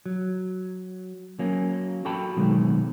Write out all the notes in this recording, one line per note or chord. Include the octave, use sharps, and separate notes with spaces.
F#3
F#3 A#3 C#4
F#4 A4 G5 A5 B5
B2 D#3 F#3 G#3 A3